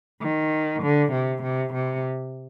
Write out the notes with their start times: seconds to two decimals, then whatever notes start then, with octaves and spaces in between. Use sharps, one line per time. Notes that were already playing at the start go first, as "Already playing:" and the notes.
0.21 D#3
0.83 D3
1.12 C3
1.43 C3
1.73 C3